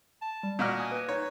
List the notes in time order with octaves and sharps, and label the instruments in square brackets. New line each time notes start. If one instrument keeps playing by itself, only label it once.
[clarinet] A5
[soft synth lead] G3
[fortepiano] A#2 F#4 F6 [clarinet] D#5
[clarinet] G#5 [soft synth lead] D#6
[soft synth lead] B4
[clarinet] D#4 [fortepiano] C#5